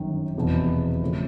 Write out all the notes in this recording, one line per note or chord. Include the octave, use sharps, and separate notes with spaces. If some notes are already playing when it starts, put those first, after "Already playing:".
Already playing: G1 F#2 D#3
F1 E2 B2
C#3 F3 A3 C#4